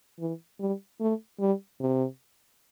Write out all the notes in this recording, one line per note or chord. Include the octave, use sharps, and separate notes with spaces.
E3
G3
A3
G3
C3